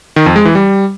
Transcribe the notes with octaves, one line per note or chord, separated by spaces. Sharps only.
D#3
F2
G#3
E3
G3